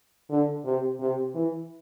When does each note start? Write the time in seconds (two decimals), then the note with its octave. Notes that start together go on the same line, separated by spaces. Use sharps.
0.30 D3
0.65 C3
1.00 C3
1.35 E3